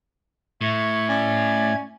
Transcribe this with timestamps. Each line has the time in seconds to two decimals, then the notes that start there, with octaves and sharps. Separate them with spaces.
0.61 A2 E5 C#6 G#6
1.09 C#4 D5